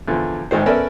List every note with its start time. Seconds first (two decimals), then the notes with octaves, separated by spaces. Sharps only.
0.08 E2 D3 F3
0.51 A1 G#2 D#3 C5
0.66 B3 C#4 A4 A#4 D5 E5